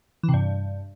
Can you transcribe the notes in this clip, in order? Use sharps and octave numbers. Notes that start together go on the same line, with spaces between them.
E3
C3
G2